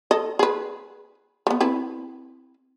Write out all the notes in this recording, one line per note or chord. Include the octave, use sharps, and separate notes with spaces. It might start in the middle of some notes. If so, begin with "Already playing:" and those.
A4 D#5
G#4 B4
A3 B3
C4 E4 B4